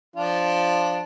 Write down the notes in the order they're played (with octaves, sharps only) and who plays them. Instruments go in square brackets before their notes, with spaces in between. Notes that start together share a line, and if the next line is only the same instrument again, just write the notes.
[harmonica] F3 D4 F4